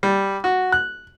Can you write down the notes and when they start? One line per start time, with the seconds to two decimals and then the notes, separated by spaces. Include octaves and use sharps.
0.03 G3
0.44 F#4
0.72 F#6